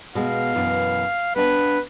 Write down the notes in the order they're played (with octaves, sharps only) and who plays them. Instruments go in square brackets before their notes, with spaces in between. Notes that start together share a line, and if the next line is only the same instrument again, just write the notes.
[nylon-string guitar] B2 G#3 [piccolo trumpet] F5
[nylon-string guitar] F#2 B2 E3
[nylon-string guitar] B3 D4 E5 [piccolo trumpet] B4